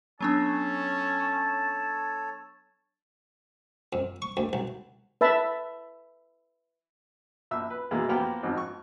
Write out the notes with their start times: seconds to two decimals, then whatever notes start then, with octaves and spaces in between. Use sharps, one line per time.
0.21 F#3 B3 C#4 D4 A4 C#5 A5
3.93 F2
4.22 C#6
4.37 D2
4.53 B1
5.21 B4 E5 A5 B5
7.51 A#1 E5 E6
7.70 B4
7.91 B2 E3 G#3 A#3
8.09 F3 A#3 B3 G4 G5 F6
8.43 G#1 F2 G#2
8.58 C#6